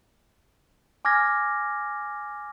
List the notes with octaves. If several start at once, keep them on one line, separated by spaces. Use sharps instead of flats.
G#5 D6 F6 G#6 A#6